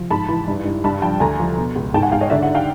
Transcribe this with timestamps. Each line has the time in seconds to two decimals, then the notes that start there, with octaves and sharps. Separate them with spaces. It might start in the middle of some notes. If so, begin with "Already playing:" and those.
Already playing: F3
0.11 G#2 A5 B5
0.29 E3
0.48 G2
0.65 G2
0.84 G2 A5 B5
1.02 F3 G5 A5
1.20 D2 G#5 A#5
1.40 F3
1.57 B2
1.75 C#2
1.94 G#2 G5 A5
2.02 F#5 G#5
2.12 G#2 F5 G5
2.21 C#5 D#5
2.30 D3 D5 E5
2.42 E5 F#5
2.55 F5 G5